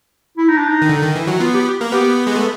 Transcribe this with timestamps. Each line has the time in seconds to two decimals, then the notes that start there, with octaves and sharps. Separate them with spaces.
0.37 E4
0.48 D#4
0.58 D4
0.69 D#4
0.82 D#3
0.89 D3
1.02 D#3
1.16 E3
1.27 F#3
1.40 B3 F4
1.54 G4
1.67 G4
1.81 A#3
1.92 B3 G4
2.27 G#3
2.36 A3